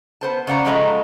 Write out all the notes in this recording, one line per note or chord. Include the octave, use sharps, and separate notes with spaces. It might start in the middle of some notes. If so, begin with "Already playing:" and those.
B3 C5 A5
C#3 D5 F#5 A#5
C#3 F3 G#3 A3 D#5 A#5